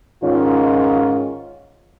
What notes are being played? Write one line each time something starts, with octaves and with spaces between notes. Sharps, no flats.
G#2 D#3 C#4 F4